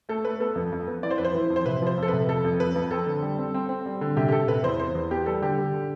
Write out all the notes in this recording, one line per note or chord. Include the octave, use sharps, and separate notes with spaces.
A3 A4
A3 B4
B3 A4
F2
F2
B3
E3 D5
C5
F2 B4
C5
E3
F2
C5
C3 B4
F3 C5
F2
A4
C3 B4
F2 A4
F2
F2 B4
F2
C4 A4
D3
G3
C4
C4
C4
G3
D3
C3 G4
G4
C3 A4
C3 B4
E2 C5
B3 C5
E2
B3 G4
G3 A4
D3 G4
D3
D3